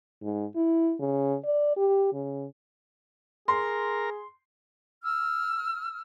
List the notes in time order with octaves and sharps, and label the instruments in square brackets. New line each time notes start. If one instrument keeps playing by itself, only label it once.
[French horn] G#2
E4
C#3
D5
G4
C#3
[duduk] G#4 [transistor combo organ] A#4 [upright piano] C6
[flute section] E6 F6